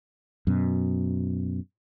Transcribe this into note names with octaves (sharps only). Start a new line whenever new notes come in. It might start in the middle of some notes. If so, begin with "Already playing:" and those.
F#2 B2